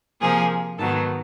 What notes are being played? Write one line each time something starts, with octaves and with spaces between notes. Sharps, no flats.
C3 F3 A#3 G#4 G#5
G#2 D#3 F#3 B3 A4 A5